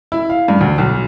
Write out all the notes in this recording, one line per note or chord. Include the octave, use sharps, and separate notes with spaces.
E4
F5
G2
D2
B1